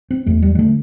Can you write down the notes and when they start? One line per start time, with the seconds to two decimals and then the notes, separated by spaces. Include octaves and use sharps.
0.11 C4
0.26 E2 A3
0.42 G3
0.55 G3
0.59 D3 A3